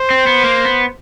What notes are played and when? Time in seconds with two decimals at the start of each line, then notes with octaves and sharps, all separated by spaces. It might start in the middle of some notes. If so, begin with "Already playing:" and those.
Already playing: C5
0.10 C4
0.27 B3
0.43 A#3
0.65 B3